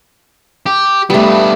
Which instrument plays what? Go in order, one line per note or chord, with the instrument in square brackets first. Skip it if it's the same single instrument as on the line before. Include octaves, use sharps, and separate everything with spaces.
[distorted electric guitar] G4
[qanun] G3 A3 [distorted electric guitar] B3 D4